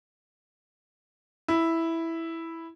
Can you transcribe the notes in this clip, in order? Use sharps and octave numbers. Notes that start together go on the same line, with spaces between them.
E4